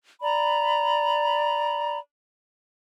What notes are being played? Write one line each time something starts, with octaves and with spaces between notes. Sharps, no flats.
D5 A#5 B5